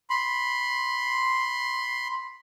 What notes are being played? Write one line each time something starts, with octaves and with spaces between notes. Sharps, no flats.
B5 C6